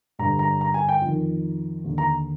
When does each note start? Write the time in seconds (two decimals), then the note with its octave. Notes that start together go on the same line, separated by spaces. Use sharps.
0.19 G2 D3 A#5
0.39 A#5
0.61 A#5
0.74 G#5
0.89 G5
1.01 F2
1.07 D#3
1.84 D#2 D3
1.98 A#5